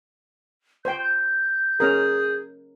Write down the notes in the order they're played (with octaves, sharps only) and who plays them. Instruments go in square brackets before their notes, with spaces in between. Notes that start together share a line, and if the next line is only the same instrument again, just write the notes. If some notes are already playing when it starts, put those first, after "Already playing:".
[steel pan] C5 G5 [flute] G6
[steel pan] C#4 A#4 [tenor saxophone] G#4